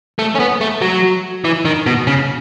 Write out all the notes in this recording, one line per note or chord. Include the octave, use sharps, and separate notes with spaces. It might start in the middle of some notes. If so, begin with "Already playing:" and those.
A3
C#4
B3
A3
F#3
E3
D#3
B2
C#3